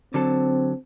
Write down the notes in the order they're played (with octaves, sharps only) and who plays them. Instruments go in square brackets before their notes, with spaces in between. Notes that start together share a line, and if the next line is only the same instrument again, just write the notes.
[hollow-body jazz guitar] D3 F#3 A4 [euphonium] C4